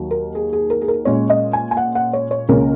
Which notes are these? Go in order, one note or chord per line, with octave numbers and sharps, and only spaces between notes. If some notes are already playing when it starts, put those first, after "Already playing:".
Already playing: D#2 D#3 F#3
A#4
G#4
G#4
A#4
G#4
A#4
A#2 G#3 C#4 C#5
D#5
G#5
G#5
F#5
F#5
C#5
C#5
C#2 C#3 A#3 C#4 A#4